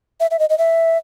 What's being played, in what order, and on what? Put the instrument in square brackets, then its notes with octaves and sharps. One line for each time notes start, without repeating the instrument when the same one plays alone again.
[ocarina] E5
E5
D#5
D#5
E5